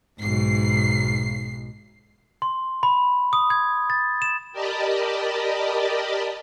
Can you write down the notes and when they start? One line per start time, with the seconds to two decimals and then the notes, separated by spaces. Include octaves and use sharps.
0.21 B1 G#2 C7
2.42 C6
2.83 B5
3.33 D#6
3.50 G#6
3.90 A6
4.22 E7
4.52 G4 A#4 D5 D#5 A5 B5